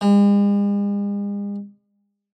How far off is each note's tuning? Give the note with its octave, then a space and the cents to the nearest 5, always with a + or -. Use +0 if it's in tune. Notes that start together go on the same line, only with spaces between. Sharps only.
G#3 -45